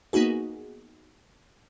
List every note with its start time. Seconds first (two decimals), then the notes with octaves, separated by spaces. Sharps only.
0.13 A#3 B3 D#4 F#4 G#4